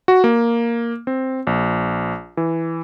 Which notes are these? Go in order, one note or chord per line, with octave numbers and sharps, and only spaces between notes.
F#4
A#3
C4
A#1
E3